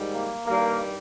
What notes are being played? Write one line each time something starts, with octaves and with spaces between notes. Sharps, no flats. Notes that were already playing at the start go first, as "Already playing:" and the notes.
Already playing: G#2 D#3 G3
A#3
G2 D#3 G3 A#3